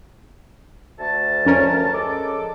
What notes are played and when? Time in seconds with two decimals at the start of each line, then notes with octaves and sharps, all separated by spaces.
0.99 D2 A5
1.45 F2 C#4 A#4
1.93 G#3 A4 D6